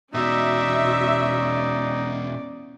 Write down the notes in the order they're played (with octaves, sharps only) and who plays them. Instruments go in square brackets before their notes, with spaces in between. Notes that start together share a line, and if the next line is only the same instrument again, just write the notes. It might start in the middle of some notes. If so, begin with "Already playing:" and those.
[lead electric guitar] E2 B2 [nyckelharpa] C#4 D5 [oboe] D#4 [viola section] F#4 E5